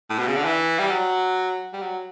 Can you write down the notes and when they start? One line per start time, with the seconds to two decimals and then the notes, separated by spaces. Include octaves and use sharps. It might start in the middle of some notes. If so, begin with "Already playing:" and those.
0.10 A2
0.19 B2
0.27 C#3
0.36 D3
0.45 E3
0.79 G3
0.90 F#3
1.73 G3
1.82 F#3